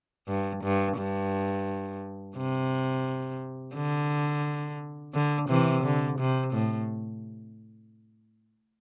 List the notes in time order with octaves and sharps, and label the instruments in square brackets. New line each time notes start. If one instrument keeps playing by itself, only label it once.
[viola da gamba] G2
G2
G2
C3
D3
D3
C3 E3
D3
C3
A2